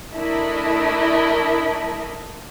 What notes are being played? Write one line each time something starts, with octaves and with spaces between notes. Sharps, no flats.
A3 D4 E4 A#4 D#5